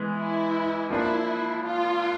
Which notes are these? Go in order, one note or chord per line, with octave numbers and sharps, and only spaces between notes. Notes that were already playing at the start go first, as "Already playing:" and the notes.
Already playing: E3 G#3 B3
E4
F3 A#3 D4 E4
F4